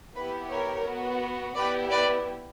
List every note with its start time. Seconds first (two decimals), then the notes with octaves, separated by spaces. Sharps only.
0.15 B3 E4 G4 B4
0.50 A#4 C#5
0.85 B3 F#4
1.55 B3 E4 G4 B4 D5
1.91 B4 D5